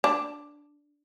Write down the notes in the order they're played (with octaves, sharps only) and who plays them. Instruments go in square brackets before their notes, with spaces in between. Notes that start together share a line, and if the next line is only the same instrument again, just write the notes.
[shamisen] D4